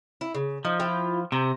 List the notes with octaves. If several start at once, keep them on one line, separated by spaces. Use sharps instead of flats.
E4
C#3
F3 D#4
E4 F4 G5
C3 A#5